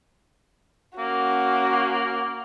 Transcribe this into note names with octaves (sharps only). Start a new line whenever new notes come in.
A#3 C#4 F#4